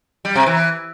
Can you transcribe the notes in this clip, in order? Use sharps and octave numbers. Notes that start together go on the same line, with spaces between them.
G3
C3
E3